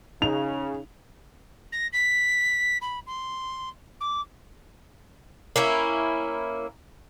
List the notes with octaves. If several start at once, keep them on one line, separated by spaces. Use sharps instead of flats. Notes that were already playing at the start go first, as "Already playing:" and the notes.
C#3 D#4 F7
A#6
B6
B5
C6
D6
A#3 C#4 E4